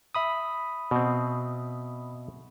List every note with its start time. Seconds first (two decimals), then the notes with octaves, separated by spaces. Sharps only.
0.15 E5 B5 D#6
0.91 B2 C4